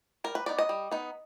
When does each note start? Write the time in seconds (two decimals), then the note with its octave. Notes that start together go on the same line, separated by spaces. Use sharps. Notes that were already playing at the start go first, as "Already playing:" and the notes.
0.24 G3 A#4
0.35 B4
0.46 B3 D#4 D5
0.59 D#5
0.69 G3
0.92 B3 D#4